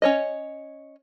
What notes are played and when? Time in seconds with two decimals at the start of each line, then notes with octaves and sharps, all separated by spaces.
0.02 C#4 C#5 D#5